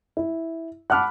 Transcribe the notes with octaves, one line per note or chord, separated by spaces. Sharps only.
E4
F#5 A5 B5 D6 F6 F#6